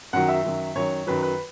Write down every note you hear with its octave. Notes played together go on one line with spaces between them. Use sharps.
F#2 D#3 F#3 F#5
E5
F#2 D#3 F#3
F#2 D#3 F#3 C#5
F#2 D#3 F#3 B4
B4